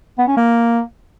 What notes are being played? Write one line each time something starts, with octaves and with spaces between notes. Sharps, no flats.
B3
C#4
A#3